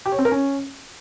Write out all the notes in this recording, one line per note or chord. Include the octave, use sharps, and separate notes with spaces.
G4
C#5
C4
A#4
C#4